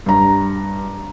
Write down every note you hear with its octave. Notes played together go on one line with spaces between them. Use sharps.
G2 A#5